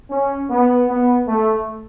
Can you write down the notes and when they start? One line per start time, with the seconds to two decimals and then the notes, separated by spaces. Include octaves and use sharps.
0.10 C#4
0.50 B3
0.89 B3
1.28 A3